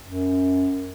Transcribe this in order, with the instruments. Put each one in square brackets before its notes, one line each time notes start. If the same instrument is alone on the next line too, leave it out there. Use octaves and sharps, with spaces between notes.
[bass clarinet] F#2